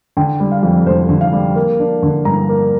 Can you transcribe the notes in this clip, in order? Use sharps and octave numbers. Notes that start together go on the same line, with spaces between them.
D3 G5
G3
F5
F2
F1 C5
D3
F5
G3
A#3
D4
D3
G2 A#5
A#3